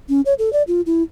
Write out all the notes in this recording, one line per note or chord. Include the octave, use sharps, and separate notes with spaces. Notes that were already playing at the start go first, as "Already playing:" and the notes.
C#4
C#5
A4
D5
F4
E4